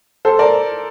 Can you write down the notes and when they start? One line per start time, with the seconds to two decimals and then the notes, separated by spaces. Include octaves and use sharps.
0.25 A4 C5
0.39 A#4 D5